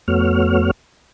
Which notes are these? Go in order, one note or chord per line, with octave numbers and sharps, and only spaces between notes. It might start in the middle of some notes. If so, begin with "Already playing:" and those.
F2 A3 B3 F#4 C#5 F6